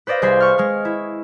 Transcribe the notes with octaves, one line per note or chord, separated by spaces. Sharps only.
B4 C5 D5 D#5 F5
C2 G#4 C5 C6 B6
C#6 F6
G#3 F6
E4